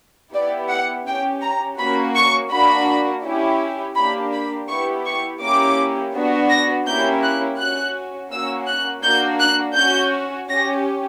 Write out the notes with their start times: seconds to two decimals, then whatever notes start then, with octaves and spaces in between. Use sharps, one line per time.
0.34 B3 E4 G4 D5
0.70 F#5
1.06 C#4 G4 G5
1.42 A#5
1.79 A#3 C#4 F#4 B5
2.15 C#6
2.51 A#3 D4 F#4 B5
3.24 C#4 E4 G4
3.96 A#3 D4 G4 B5
4.32 B5
4.69 B3 E4 G4 C#6
5.05 C#6
5.41 A#3 C#4 E4 G4 D6
6.14 B3 D4 F#4
6.49 A#6
6.86 A#3 C#4 E4 G4 G6
7.22 F#6
7.58 C#4 F#4 F#6
8.30 A#3 C#4 F#4 E6
8.67 F#6
9.03 A#3 D4 F#4 G6
9.40 F#6
9.76 C#4 F#4 G6
10.48 C#4 G4 A#6